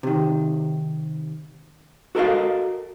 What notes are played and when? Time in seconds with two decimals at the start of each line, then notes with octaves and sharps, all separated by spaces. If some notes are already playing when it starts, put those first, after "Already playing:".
0.03 C3 D#3
2.15 F#4 A4 A#4 C5 D#5 F5